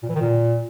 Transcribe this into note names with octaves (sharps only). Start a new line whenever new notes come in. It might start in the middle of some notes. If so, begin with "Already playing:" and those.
A#2
E3
D#3
A#2